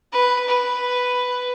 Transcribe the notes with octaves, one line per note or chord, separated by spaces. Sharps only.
B4
B4